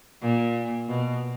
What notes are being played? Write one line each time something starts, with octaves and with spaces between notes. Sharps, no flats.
A#2
B2